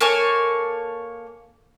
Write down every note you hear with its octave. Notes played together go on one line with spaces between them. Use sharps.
A#3 A4 C#5 G#5